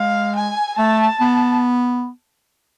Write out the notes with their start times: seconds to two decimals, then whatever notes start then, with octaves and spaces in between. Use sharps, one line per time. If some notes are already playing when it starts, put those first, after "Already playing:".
Already playing: G#3 F5
0.35 G#5
0.78 A3 A5
1.21 B3